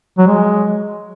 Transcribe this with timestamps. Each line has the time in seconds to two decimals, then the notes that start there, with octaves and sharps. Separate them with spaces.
0.18 F#3
0.27 G#3